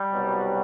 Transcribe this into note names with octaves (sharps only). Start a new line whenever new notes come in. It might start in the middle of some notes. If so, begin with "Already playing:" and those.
Already playing: G3
C2 B2 F#3